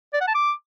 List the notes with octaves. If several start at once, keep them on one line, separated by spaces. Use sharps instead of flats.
D5
F#5
A5
D6